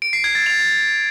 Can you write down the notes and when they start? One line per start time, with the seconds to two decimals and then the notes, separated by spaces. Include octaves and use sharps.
0.02 D7
0.13 C7
0.24 G#6
0.35 A6
0.46 F7